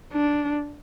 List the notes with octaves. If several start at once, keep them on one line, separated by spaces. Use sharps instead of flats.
D4